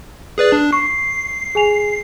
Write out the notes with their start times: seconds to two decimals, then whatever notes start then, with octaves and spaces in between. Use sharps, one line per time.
0.38 G#4 B4 D5
0.52 D4
0.72 C#6 C7
1.55 G#4 G#5 F7